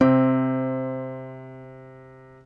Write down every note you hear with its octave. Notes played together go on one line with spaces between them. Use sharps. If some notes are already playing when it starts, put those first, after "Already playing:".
C3 C4